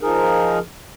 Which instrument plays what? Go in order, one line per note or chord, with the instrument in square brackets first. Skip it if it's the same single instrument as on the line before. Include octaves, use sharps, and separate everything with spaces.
[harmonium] F3 D#4 G#4 A#4